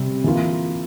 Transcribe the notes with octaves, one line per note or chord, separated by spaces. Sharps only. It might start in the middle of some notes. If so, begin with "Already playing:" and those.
Already playing: C3 G3 C4
E3 A#3 F4